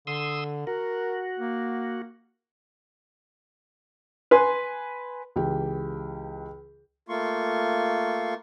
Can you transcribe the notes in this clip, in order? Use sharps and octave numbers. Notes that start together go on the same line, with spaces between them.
D3 C6 D#6 E6
F#4 A#4
A#3
B4 G#5 C6
C#2 E3 G4 G5
A3 A#3 F4 C6 C#6